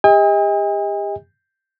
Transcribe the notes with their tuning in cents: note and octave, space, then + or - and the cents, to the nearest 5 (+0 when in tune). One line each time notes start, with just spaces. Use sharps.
G4 +40 D#5 +30 G#5 -45